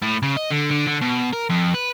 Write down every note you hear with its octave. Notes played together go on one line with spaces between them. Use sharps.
A2
C#3
D#5
D3
D3
D3
B2
A#4
F2
B4